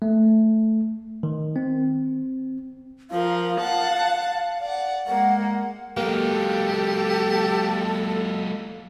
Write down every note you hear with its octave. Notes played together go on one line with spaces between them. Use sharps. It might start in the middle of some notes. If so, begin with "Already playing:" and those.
A3
D#3
C4
F3 A#4 F5
F#5 A5 F#6
D5 F#5
G#3 A#3 F#5
F#3 G#3 A#3 G4 A4 F5